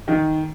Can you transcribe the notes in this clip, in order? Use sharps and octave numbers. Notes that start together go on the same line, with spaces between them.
D#3